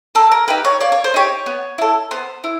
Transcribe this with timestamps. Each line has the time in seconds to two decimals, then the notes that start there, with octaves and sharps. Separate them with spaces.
0.15 A#3 A4
0.32 A#4
0.48 D#4 G4 B4
0.65 C#5
0.81 A#3 D5
0.92 C#5
1.04 C5
1.14 D#4 G4 C#5
1.46 B3
1.78 E4 A4
2.11 B3 C5
2.44 E4